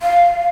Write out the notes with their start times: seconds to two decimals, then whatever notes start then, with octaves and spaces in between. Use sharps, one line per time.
0.02 F5